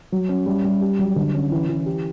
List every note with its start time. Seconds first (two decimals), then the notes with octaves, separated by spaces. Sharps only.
0.12 F#3
0.29 C#4
0.46 G3
0.64 G3
0.81 G4
0.99 F#3
1.16 D3
1.35 C#4
1.51 E3
1.69 E3
1.86 G4